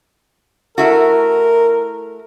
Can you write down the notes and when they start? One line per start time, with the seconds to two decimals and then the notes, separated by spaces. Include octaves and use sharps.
0.78 A3 E4 F#4 A#4